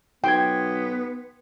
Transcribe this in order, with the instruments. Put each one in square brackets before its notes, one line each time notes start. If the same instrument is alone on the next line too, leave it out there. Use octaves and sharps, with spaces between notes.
[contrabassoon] B1 [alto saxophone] B3 [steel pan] G5 [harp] C6 G#6